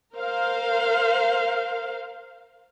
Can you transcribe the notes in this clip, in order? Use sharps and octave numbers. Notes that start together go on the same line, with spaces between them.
A#4 C5 F5